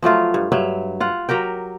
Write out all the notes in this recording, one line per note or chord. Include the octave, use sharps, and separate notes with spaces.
F3 F#3 A3 F4
G2
G2 F#3 E5
F4 F#5
F#3 G4 A#4 G5